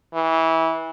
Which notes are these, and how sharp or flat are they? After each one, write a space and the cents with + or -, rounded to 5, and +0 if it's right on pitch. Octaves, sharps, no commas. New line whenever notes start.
E3 -20